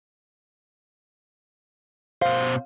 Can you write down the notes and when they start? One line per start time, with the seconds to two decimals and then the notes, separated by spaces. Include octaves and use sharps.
2.22 B2 C5 F5